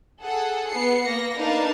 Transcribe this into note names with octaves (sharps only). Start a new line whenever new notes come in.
G#4 A4 F#5
B3 C7 C#7
A#3 A#6
D4 D#4 A#4 B4 F5 A5